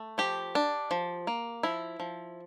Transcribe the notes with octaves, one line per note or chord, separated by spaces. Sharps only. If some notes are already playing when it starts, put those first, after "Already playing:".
Already playing: A3
F3 G4
D4
F3
A#3
F3 E4
F3